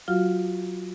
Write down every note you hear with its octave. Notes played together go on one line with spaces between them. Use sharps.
F#3 F4 F#4 F5 F6